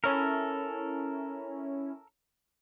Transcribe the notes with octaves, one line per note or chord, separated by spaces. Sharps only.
C#4 E4 A4 A#4